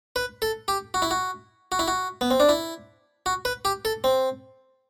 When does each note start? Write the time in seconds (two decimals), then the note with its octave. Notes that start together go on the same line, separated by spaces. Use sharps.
0.16 B4
0.42 A4
0.68 G4
0.94 F#4
1.02 E4
1.11 F#4
1.72 F#4
1.79 E4
1.88 F#4
2.21 B3
2.31 C4
2.40 D4
2.49 E4
3.26 F#4
3.45 B4
3.65 G4
3.85 A4
4.04 C4